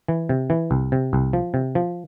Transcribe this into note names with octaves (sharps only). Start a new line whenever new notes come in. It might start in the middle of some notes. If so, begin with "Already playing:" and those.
E3
C3
E3
C2
C3
C2
F3
C3
F3